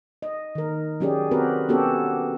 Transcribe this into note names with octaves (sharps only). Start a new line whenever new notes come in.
D#5
D#3 A#4
F#3 C#4 G4 G#4 D5
C4 F#4 G4 A#4 B4
B3 C#4 F#4 G4 A4